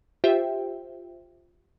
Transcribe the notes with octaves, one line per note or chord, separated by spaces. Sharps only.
F4 G4 C5 E5 G5